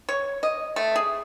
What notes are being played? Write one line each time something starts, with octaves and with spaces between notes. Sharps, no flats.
C#5
D#5
A3
G#4